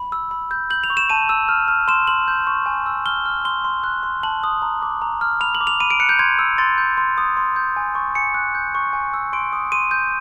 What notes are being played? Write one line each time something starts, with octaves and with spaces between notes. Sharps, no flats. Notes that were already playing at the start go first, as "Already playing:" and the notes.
Already playing: B5
E6
B5
G6
G6 F#7
F7
C#6
E7
A5 D#7
E6
F6
F6
C6 E7
C6 F#7
G6
C#6
G#5
E6
F6 G7
F6
C6 G7
C6
F#6
C6
A5 F#7
D#6
A#5
D6
A#5
F6
B5 F7
F#7
D6
F7
B5 D#7
D7
F#6 C#7
G6
C6 G#6
E6
C6 A6
G6
C6
D#6
C6
G6
G#5
C#6
G#5 C#7
F#6
G6
C#6
G#5
E6
C6 D7
D#6
C6 D#7
G6